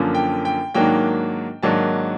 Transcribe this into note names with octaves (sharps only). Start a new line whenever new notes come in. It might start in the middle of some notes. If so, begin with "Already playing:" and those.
Already playing: F#2 D3 F3 A#3 C#4
G5
G5
G#2 D#3 F#3 A#3 D4 G5
G#2 D#3 F#3 A#3 D4 A5